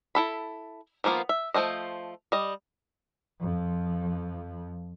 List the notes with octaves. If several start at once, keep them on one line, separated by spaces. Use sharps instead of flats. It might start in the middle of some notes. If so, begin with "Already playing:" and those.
E4 A4 B5
D#3 F3 A#3 B3 F4
E5
F3 A3 C5 D#5
G3 D#5
F2 F3